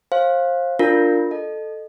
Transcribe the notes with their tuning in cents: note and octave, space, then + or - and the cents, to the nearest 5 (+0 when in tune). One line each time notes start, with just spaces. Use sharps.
C5 +30 F5 +0
D4 +0 F4 +0 A#4 -15
A4 +0 D#5 -25